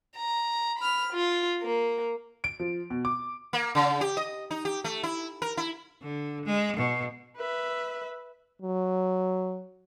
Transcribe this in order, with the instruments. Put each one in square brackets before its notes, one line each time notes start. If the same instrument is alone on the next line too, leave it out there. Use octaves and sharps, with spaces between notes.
[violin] A#5
B5 F6
F4
A#3
[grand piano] D7
F3
B2
D6
[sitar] A#3
C#3
G4
D#5
D#4
G4
A3
E4
A#4
E4
[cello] D3
G#3
B2
[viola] B4 E5
[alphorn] F#3